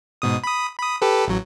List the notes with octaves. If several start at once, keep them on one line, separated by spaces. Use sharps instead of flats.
G#2 B2 D#6
B5 D#6
B5 D#6
G4 A4 B4
A1 F#3